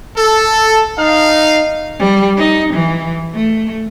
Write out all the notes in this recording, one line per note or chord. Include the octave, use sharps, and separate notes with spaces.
A4
D#4 F5
G3
D#4
E3
A3